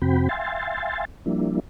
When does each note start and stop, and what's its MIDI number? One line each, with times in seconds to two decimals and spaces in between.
0.02 0.28 41
0.02 0.28 48
0.02 0.28 60
0.02 0.28 66
0.02 0.28 79
0.02 0.28 83
0.29 1.05 76
0.29 1.05 77
0.29 1.05 79
0.29 1.05 80
0.29 1.05 84
0.29 1.05 93
1.26 1.60 53
1.26 1.60 55
1.26 1.60 58
1.26 1.60 62
1.26 1.60 64